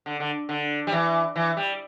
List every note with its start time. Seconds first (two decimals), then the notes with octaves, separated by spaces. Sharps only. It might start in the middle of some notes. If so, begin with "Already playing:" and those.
0.06 D3
0.20 D3
0.49 D3
0.87 G3
0.92 E3
1.36 E3
1.57 G3